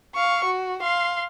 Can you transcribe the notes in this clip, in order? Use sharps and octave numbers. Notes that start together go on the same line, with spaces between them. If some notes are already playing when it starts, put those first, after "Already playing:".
F5 C#6
F#4
F5 C6